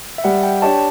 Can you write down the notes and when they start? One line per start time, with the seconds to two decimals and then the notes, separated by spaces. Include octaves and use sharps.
0.18 E5
0.24 G3 F#5
0.44 G5
0.62 D4 G4 C#5 A5